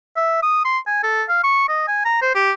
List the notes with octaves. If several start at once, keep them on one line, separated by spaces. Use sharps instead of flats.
E5
D#6
C6
G#5
A4
F5
C#6
D#5
G#5
A#5
C5
G4